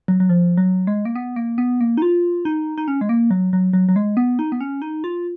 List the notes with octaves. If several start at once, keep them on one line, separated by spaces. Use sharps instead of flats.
F#3
F#3
F3
F#3
G#3
A#3
B3
A#3
B3
A#3
D#4
F4
D#4
D#4
C#4
G#3
A#3
F#3
F#3
F#3
F#3
G#3
B3
D#4
B3
C#4
D#4
F4